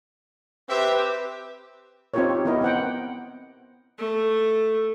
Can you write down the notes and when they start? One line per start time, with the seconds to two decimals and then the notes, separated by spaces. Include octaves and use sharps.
0.69 C4 G4 B4 E5
2.14 C4 D#4 F4 G4 A#4 C#5
2.29 G4
2.45 B3 E4 G4 A#4 D#5
2.61 B3 C4 F#5 G5
3.98 A3 A4